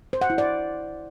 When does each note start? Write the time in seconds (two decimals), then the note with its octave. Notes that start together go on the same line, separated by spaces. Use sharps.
0.13 C5
0.21 F#5
0.30 E4
0.38 D5